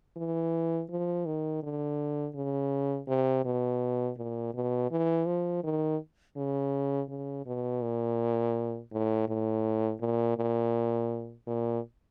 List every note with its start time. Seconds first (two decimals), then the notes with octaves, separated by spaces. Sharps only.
0.17 E3
0.90 F3
1.26 D#3
1.63 D3
2.35 C#3
3.07 C3
3.45 B2
4.17 A#2
4.54 B2
4.91 E3
5.26 F3
5.64 D#3
6.36 C#3
7.09 C#3
7.46 B2
7.82 A#2
8.92 A2
9.28 A2
10.00 A#2
10.37 A#2
11.47 A#2